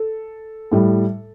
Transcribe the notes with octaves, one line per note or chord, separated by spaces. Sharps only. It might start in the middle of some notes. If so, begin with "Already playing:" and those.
Already playing: A4
A2 G3